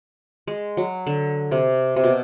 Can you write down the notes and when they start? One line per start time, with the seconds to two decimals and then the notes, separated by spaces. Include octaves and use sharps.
0.47 G#3
0.77 F#3
1.07 D3
1.51 C3
1.96 C3
2.04 B2